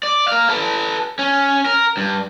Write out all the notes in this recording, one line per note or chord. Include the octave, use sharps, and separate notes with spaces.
D5
A#4 F5
A4 B4
C#4
A#4
G2